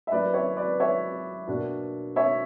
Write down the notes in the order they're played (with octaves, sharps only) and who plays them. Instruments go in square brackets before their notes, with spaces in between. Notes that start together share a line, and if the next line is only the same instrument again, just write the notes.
[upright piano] E5
[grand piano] F#3 A#3 C#4 E4 [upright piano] B4 D5
[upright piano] C#5 E5
B4 D5
C#5 E5
[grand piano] B2 A#3 D4 F#4
[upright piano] C#5 E5